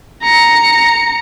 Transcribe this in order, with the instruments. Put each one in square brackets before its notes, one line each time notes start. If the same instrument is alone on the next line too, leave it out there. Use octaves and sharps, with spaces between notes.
[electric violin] A#5 C#7